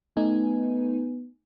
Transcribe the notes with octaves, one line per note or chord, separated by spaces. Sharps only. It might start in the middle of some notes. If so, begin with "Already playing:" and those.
A3 B3 D#4 G#5